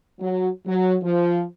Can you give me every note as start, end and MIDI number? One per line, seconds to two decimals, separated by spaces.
0.20 0.48 54
0.66 0.95 54
1.03 1.43 53